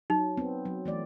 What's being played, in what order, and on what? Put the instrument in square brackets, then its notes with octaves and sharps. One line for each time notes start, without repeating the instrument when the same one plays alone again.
[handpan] F#3 [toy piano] D#4
[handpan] B3 C4
F#3
E3 A3 D5